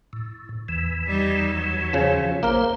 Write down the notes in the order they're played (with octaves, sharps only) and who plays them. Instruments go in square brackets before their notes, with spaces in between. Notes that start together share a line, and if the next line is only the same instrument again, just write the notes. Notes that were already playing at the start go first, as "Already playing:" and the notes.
[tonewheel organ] A2
E2 E3
[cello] G3 D#4
F#3
[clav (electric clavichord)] C#3 F3
[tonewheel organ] A#1 C5 [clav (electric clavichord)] A#3 A#4